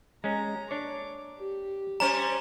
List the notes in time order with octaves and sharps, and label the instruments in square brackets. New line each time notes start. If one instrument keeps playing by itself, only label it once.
[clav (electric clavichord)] G#3 C#4 [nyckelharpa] A#5
[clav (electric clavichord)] D4 C#5 [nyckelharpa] D6
[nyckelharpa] G4
[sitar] G3 C#4 C5 [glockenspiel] A#5